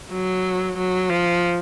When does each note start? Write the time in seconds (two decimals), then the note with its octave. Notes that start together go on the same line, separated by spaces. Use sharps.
0.13 F#3
0.77 F#3
1.09 F3